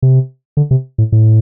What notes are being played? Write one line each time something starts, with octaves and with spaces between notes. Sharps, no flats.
C3
D3
C3
A2
A2